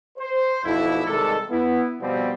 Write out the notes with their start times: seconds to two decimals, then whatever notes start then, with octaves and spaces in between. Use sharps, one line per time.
0.18 C5
0.65 B1 F2 E4
1.06 C3 D#3 G3 G#3 A4
1.50 B3 E4
2.01 B2 F3 G3 B3 C4